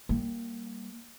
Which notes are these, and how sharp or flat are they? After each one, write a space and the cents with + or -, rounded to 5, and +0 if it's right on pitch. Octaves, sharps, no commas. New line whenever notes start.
G3 +0 A#3 +0